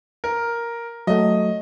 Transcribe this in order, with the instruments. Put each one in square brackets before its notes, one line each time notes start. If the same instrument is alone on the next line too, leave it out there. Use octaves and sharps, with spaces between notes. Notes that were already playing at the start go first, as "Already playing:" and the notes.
[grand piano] A#4
[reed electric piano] F#3 A3 [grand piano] D#5